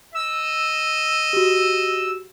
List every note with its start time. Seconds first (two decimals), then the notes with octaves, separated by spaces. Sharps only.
0.15 D#5 E6
1.33 F#4 G4